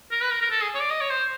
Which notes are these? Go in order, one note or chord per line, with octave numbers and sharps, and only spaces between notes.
A#4
B4
A#4
A#4
A4
G#4
C#5
D5
D#5
C#5
C5